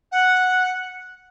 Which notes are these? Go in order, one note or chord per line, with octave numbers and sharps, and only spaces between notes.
F#5